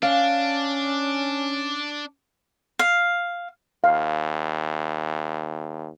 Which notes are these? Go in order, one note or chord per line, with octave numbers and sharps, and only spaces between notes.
C#4 D4 F5
F5
D#2 F5